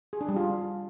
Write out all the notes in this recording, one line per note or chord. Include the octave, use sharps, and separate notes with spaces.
G#4
D4
G3
F4